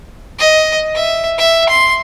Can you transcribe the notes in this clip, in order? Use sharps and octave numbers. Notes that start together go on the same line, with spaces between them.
D#5
E5
E5
C6